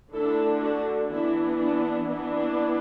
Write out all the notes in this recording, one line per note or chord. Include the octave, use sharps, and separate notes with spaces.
D3 A3 D4 E4 A4
D4 F#4
E3 B3 D4 E4
D4
E3 B3 D4